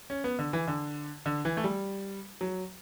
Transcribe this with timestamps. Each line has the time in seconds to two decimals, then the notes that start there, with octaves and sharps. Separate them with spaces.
0.10 C#4
0.24 B3
0.39 D3
0.53 E3
0.68 D3
1.26 D3
1.45 E3
1.57 A3
1.64 G3
2.41 F#3